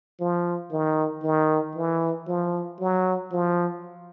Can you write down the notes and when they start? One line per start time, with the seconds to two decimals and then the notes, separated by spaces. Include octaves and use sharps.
0.20 F3
0.72 D#3
1.23 D#3
1.76 E3
2.27 F3
2.80 F#3
3.32 F3